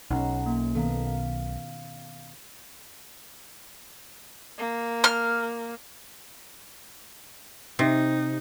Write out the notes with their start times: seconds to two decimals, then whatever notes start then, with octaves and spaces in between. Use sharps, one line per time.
0.11 B1 C#4 D#4 F#5 A#5
0.46 A#3
0.75 B2 D#3 B3 A4 F5 A#5
1.07 F5
4.58 A#3
5.04 F6
7.79 C3 D#4